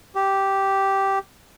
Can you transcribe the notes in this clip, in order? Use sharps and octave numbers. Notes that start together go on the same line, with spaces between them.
G4